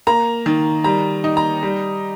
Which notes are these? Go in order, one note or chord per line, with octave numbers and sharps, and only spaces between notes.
A#3 A#5
D#3
G3 A#5
D#4
A#5
G3